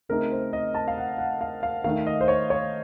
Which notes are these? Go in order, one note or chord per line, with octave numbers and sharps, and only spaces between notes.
C#3 A3 C4 D#4 A#4
C5
D#5
A5
F5
F#5
F#5
F5
F5
D#3 A3 D#4 F5
D#5
C5
C#5
C#5